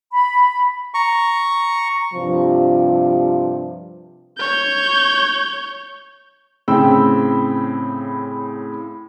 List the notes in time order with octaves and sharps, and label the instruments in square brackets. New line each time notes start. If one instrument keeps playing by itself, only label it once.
[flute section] B5
[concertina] A#5 C#6
[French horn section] G2 C3 F3
[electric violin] C#5 G6
[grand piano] A2 C#3 C4 G5 B5 E6